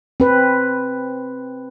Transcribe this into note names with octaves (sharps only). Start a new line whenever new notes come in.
C4 B4